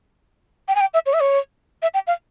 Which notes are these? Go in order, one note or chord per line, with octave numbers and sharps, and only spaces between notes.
G5
G#5
G5
E5
C#5
E5
C#5
E5
G5
F5